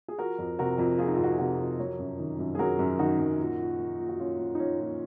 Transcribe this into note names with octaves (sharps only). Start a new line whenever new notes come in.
G#4
F3 F#4 A#4
F2
C3 F#4 A#4
F2
F3 F4 G#4
D#4
F4
F2
F#4
G#4
C3 F#4 A#4
F2
F#3 A#4 C#5
F#2
D#3
F#2
G#4
F#3 F#4 A#4
F#2
D#3 D#4 F#4
F#2
A#2
F3
F3
A#2
F#4
A#2 C#4 F4
F3
D#4
F3 C#4
A#2